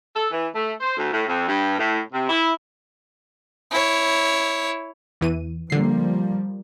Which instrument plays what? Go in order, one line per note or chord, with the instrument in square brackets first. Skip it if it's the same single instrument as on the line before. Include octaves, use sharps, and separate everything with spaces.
[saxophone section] A4
E3
A3
C5
D2
A2
F2
G2
A2
C3
E4
[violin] E4 C#5
[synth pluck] E2 E3 D#7
[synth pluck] D3 C7 [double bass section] F3 G3 A#3